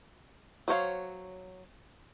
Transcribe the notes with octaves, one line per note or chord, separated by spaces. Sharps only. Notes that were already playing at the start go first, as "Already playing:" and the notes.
F#3 C5 C#5 F5